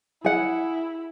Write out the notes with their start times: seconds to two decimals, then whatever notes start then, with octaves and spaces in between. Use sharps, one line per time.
0.25 E4 G#4 F#5